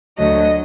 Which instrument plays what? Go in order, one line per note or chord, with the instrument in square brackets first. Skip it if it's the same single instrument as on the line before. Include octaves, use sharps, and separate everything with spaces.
[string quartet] D2 D3 F#3 A3 D#5